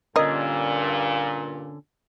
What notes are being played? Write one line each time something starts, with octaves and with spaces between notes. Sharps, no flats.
G2 A#2 D3 C#4 D4 A#4 D#5